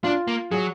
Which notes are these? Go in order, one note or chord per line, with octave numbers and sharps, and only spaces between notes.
D4 F4
A#3
F#3 G#4